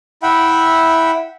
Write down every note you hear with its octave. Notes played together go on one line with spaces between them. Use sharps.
E4 E5 F#5 G5 B5